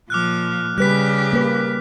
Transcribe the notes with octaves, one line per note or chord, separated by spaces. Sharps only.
A#2 F3 D6 F6 F#6
C#3 G3 G4 B4 F#6 B6
A#3 B4